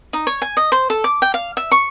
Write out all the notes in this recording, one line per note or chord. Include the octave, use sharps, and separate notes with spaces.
D#4
C#5
G#5
D#5
C5
A4
D6
G5
F5
E5
C#6